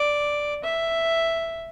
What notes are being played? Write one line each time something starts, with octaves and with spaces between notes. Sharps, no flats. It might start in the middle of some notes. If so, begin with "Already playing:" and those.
Already playing: D5
E5